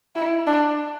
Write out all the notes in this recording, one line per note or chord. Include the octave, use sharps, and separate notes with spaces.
E4
D4